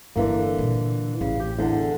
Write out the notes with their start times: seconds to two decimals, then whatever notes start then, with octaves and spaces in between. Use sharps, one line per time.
0.16 G1 G2 D3 E3 A#3
0.58 A#2 C4
1.21 A1 C#3
1.40 G4
1.59 E2 D3